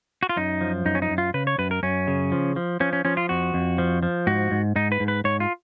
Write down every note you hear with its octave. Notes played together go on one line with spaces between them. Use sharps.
F#4
F4
F#2 D#4
F3
F#2 D#4
C#4
D#4
F#2
F4
C#3 B4
C#5
F#2 B4
A#4
F#2 C#4
C#3
F3
F3
F3 C#4
C#4
F3 C#4
F4
F2 F#4
F2
F3
F3
G#2 F#4
G#2
G#2 D#4
B4
G#2
B4
G#2 C#5
F4